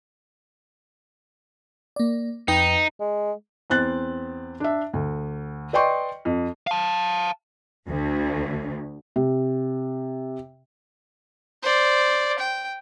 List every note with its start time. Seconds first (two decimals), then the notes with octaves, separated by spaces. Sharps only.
1.96 A#3 D5
2.48 F2 D#4 B4 G5
3.00 G#3
3.70 E2 C4 F#6 A6
4.60 D4 E5
4.93 D2
5.73 B4 D5 D#5 G5 C6 C#6
6.25 F2
6.67 F5 A5
7.87 D2
9.16 C3
11.62 C5 D5
12.39 G5